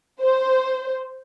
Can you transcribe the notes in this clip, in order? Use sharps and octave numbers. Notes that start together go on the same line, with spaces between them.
C5